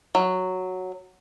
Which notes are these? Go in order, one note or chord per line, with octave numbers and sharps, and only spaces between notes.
F#3